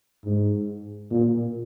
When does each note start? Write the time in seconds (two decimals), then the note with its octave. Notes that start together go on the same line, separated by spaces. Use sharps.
0.25 G#2
1.11 A#2